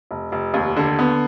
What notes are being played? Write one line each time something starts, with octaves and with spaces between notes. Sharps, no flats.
F1
F1
D#2
D3
B3